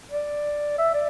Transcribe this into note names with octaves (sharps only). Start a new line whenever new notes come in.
D5
E5
D5